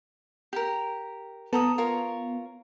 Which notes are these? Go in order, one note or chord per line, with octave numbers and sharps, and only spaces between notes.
G4 A#4
B3 A4 A#5 D#6
F4 A#4 C#5